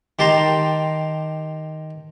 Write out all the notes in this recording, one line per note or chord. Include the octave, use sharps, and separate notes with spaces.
D#3 G4 A5 A#5 C6